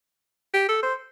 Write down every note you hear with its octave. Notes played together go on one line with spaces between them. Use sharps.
G4
A4
C5